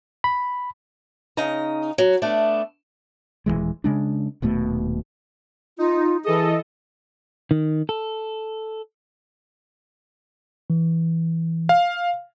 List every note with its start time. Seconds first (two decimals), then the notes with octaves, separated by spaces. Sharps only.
0.24 B5
1.37 C#3 D#4 A#5
1.98 F#3
2.22 A3 B3 D4
3.46 D#1 C#2 E3 G#3
3.84 C#3 G#3 D4
4.42 D#1 D#2 B2 A3
5.79 D#4 F4
6.24 E3 G#4 A4 D#5
7.51 D#3
7.89 A4
10.70 E3
11.69 F5